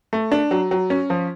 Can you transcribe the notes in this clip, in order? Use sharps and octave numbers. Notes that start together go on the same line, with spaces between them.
A3
D4
F#3
F#3
C#4
F3